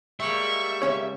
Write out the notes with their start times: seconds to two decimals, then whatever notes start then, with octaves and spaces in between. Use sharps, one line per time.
0.20 G3 G#3 A#3 E5 C#6
0.82 C#2 C#4 C#5